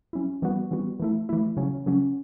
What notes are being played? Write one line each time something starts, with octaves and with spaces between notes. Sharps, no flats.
F#3 C#4 E4
E3 G3 B3 F#4
E3 G3 B3 F#4
E3 A3 E4
E3 A3 E4
C#3 F#3 C#4
C#3 F#3 C#4